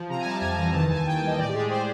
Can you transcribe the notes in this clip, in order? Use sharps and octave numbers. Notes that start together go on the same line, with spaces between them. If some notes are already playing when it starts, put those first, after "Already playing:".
Already playing: F3
C3 A#5
G#5
G3 A5
F2 G#5
E3 A#5
D#3 A5
D#2 G#5
D#2 G5
G3 D#5
A2 D5
G4
G#3 G#4
C5